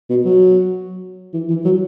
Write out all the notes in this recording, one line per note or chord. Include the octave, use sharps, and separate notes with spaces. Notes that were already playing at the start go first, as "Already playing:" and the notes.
B2
F#3
E3
E3
F#3